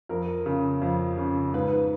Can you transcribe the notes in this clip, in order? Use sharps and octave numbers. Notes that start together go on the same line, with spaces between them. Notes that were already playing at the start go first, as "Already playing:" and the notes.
F2 A#4
C#3
F2
C#3
G#2 B4
B4